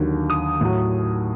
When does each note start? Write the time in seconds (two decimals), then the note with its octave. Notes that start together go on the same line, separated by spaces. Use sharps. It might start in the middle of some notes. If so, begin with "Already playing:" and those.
Already playing: D#2 D3 F#3
0.30 D#6
0.61 A2 F#3